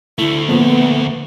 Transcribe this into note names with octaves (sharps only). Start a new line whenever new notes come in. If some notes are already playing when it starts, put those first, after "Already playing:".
D2 A3 E4
A#2 F3 B3